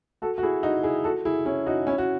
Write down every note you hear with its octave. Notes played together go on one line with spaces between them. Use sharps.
F#4 A4
F#4
E4 G#4
D#4 F#4
E4 G#4
F#4 A4
E4 G#4
C#4 E4
D#4 F#4
C#4 E4
F#4